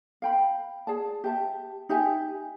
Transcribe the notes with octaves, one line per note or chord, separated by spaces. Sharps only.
F5 G5 B5
G#4 D5 A5
G4 E5 A5
D#4 G4 E5 G#5